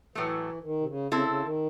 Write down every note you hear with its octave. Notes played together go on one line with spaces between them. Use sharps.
A2 E3 F#3 A3
D#3
C3
C#3
C#3 C4 E4 A4
C#3
D#3